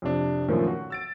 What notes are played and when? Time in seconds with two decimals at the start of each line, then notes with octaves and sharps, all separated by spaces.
0.02 F2 C3 D4
0.48 F#2 A#2 D#3 F3 A3 A#3
0.68 F#4
0.90 E6 A6 D7